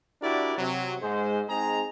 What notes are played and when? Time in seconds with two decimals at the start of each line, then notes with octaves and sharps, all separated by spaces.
0.22 D4 E4 F#4 G4 A#4 D5
0.58 C3 F#3
1.01 G#2 G#3 C5
1.48 G#3 C4 D#4 G#4 A#5